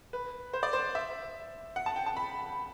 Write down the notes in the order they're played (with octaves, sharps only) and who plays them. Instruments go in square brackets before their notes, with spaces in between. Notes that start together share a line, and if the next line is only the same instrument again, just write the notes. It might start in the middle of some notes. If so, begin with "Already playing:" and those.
[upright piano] B4
C5
D5
C5
E5
F#5
A5
G5
A5
B5